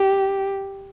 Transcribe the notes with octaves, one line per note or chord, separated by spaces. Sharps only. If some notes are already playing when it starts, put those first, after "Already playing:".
Already playing: G4